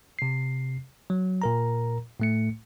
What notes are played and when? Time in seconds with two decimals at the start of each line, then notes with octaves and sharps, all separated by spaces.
0.19 C3 C7
1.10 F#3
1.42 A#2 A#4 A#5
2.20 A2 A3 C#7